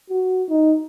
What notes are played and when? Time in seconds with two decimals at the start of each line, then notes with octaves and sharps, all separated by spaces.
0.10 F#4
0.50 D#4